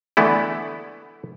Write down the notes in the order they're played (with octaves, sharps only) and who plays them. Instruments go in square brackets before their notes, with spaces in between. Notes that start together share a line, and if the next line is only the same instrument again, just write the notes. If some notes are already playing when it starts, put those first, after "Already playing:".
[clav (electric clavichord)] D3 E3 A3 B3 E4